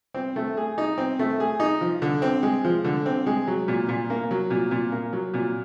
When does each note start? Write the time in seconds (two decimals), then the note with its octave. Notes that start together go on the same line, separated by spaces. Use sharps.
0.14 C4
0.36 A3
0.57 G#4
0.78 D#4
0.98 C4
1.19 A3
1.40 G#4
1.60 D#4
1.81 F3
2.02 D3
2.22 C4
2.43 G#3
2.65 F3
2.84 D3
3.06 C4
3.27 G#3
3.48 F#3
3.68 A#2
3.89 A#2
4.10 A#3
4.31 F#3
4.50 A#2
4.71 A#2
4.92 A#3
5.13 F#3
5.34 A#2